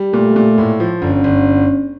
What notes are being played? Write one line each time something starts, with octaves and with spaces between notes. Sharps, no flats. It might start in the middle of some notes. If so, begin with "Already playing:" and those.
Already playing: G3
A#2 A3
A#2
A2
F3
G1 C#4
G1